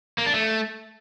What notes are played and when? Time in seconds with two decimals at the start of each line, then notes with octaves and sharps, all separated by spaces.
0.18 A#3
0.26 D4
0.34 A3